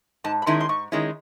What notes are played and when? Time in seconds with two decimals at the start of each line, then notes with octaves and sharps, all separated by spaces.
0.24 G#2 A5
0.42 B5
0.46 D#3 G#3 C#4 E4 C6
0.60 C6
0.69 G#2 C#6
0.92 D#3 G#3 C#4 E4